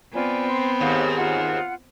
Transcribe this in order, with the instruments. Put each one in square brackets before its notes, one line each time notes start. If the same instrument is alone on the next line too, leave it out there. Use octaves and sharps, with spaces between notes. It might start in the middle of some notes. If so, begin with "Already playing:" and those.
[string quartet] B3 C4 [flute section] F4 D5 G#5
[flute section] C6
[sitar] D#2 G#2 [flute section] F5 F#5
[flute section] F4 F#5